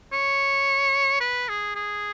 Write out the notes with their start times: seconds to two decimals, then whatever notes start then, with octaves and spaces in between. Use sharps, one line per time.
0.13 C#5
1.21 B4
1.49 G#4
1.76 G#4